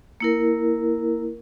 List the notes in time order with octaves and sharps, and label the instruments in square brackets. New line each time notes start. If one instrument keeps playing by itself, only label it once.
[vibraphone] A#3 E4 A#4